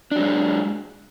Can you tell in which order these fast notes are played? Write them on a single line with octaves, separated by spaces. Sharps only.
D4 F#3 G#3